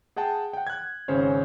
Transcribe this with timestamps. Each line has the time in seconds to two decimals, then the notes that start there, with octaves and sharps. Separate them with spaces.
0.16 G#4 F#5 G5 A5
0.53 F#5 G5
0.67 F#6 G#6
1.08 G#1 C#3 C#4 C5 C#5